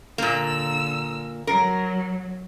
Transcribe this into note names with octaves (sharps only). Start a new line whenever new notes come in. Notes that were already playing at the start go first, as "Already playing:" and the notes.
A#2 D3 A#3 E6
F#3 A#4